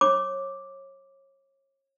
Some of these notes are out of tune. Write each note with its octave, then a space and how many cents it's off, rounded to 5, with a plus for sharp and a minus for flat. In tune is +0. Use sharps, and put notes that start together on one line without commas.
C#5 -30 D6 +0